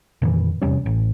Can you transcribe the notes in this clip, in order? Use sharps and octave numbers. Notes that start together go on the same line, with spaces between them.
F2 A#2 D#3 E3
E2 C3 G3 C#4
A1